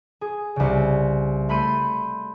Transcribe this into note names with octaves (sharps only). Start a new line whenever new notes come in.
G#4
C2 C#3
A3 B5 C6 G6 D#7